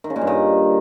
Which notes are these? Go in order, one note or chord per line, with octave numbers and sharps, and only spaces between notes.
D#3
C#3
A#2
G2
D#3